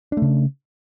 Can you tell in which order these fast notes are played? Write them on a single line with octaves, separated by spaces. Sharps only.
D4 A3 C#3